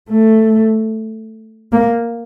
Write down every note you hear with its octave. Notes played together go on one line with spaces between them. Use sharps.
A3
A#3